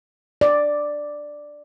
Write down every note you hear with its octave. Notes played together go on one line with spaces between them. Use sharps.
D5